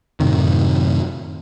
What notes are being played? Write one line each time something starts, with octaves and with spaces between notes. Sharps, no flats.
F#2 A2 C3 D#3